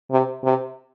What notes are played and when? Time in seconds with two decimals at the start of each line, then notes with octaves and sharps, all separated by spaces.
0.11 C3
0.44 C3